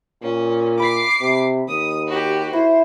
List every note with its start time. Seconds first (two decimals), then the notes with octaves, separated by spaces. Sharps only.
0.22 A#2 C#4
0.80 B5 D6 C7
1.21 C3
1.68 D#2 D#6
2.07 F#4 G4
2.53 E4 C5